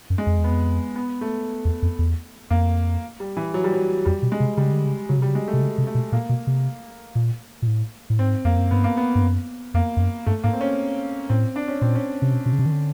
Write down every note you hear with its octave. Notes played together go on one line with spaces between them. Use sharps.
F#2
G#3
F2
E2
B3
F2
B3
A3
E2
F2
E2
F2 A#3
G3
E3
F#3
G3
F#3
F2 G3
B2
G#3
C3
C#3 G3
D3
C#3
C#3 F#3
C3
G3
C#3
G#3
A3
C3
C#3
C3
A3
B2
A#2 A#3
B2
C3
A#2
A#2
A2
A2
G#2 C4
F2 A#3
F#2
G2 B3
A#3
B3
G2
F#2
F2 A#3
F2
F#2
G2 A3
G#2 A#3
C4
C#4
A2 C4
D4
C#4
A#2 C4
C#4
C3
B2
B2
C#3
C3
D#3
D3